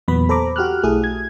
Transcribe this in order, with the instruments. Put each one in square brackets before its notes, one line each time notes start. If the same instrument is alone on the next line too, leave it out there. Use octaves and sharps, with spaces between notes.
[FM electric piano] E2 A#2 F#3 B3 B4 B5
A4 C5 A#5 B5 D6
F#4 G4 F6 F#6
B1 A3 E4 G#4 A4 D#6
G#6